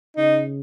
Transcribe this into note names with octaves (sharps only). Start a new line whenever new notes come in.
C#3 D#4